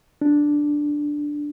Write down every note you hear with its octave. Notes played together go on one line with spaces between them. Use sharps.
D4